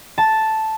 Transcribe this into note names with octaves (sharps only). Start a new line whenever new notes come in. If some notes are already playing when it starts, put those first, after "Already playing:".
A5